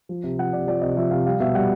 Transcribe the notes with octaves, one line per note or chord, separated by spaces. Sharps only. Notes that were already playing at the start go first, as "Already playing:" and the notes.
F3
C3
F3 F#5
C3 D5
F3 D5
C3 D#5
F3 E5
C3 F5
G3 F5
B2 E5
G3 F#5